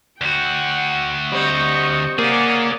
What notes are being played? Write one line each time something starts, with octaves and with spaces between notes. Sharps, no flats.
D2 F#4 F#5 G5
G3 C4 D#5 C#6
A#3 C#4 G#4 D5 F#5